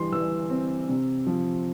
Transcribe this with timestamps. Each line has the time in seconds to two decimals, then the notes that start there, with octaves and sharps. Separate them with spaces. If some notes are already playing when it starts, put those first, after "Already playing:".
Already playing: E3 G3 C6
0.12 E3 E6
0.50 C4
0.89 C3
1.27 F3